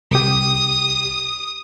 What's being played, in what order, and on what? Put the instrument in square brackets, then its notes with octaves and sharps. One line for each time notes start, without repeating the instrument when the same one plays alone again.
[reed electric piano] C2 G4 [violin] D#6